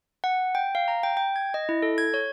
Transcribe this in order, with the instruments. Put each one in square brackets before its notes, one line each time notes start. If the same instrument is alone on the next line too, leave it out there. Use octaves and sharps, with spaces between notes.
[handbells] F#5
G5
F5
A#5
G5
G5
G#6
D#5
E4
A4
G#6
C#5